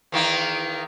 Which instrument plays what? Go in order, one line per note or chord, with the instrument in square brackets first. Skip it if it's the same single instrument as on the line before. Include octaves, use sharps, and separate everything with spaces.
[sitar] E2 D#3 A#3